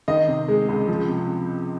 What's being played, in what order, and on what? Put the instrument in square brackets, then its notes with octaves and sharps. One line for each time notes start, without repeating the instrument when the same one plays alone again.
[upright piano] D#3 D#5
C3
G#3
C#2
F3
C3